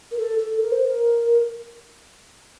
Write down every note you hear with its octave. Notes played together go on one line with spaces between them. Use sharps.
A#4
A4
A4
A#4
C5
A#4